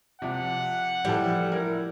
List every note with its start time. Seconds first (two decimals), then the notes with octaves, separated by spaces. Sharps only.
0.22 C3 F3 D5 F#5 D6
1.05 A2 E3 F3 G3 E4 G4 A4
1.52 E4 A#4